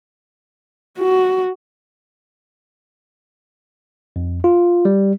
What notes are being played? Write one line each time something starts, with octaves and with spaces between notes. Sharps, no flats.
F#4
F2
F4
G3